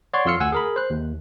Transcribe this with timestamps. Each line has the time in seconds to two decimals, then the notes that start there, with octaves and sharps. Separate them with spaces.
0.13 C#5 D5 F#5 C6 C#6
0.25 F2 F4 C6 E6 F6 C#7
0.40 D2 F#5 G#5 E6
0.52 G#4 A#4 B5
0.76 C5 F#6
0.90 D#2